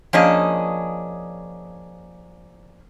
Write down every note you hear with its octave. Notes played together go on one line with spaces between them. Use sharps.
F3 A#3 C#4 D4 G#4 D#5